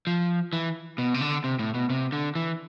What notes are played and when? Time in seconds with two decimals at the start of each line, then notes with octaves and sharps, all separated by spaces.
0.07 F3
0.53 E3
0.98 B2
1.14 C3
1.21 D3
1.44 C3
1.59 A2
1.74 B2
1.90 C3
2.12 D3
2.35 E3